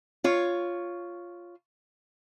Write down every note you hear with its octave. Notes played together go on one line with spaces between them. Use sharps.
F4 C#5